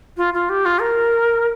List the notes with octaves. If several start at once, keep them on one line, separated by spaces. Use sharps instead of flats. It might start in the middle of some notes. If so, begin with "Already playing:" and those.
F4
F4
G4
F4
A#4